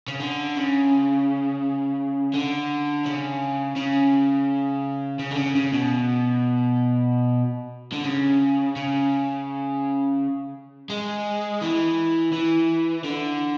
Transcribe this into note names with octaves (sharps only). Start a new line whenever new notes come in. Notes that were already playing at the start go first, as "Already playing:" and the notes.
C#3
D3
C#3
D3
C#3
C#3
C#3
D3
C#3
C#3
B2
D3
C#3
C#3
G#3
E3
E3
D3